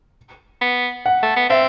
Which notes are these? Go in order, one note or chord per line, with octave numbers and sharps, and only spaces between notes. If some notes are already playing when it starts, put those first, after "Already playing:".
B3
F#5
A3
B3
C4 E5